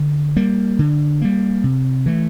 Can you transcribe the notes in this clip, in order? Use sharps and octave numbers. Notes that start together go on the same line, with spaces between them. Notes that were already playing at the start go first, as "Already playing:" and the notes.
Already playing: D3
G3 A#3
D3
G3 A#3
C3
E3 A3